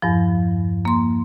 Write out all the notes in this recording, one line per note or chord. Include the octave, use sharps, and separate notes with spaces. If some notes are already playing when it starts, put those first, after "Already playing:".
E2 G2 F3
A#3 C6